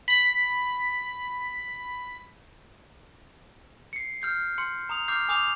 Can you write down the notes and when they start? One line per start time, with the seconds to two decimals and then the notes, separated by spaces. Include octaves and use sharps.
0.08 B5 B6
3.93 C7 C#7
4.22 F6 G6 C7
4.58 C6 C#7
4.89 A#5 D#6 F7
5.08 D6 F6 G6 C7
5.29 G#5 D6 D#6 G6 F7